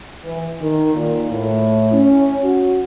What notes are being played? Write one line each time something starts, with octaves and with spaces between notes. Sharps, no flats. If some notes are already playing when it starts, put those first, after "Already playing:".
E3
D#3
A#2
A2
C#4
F#4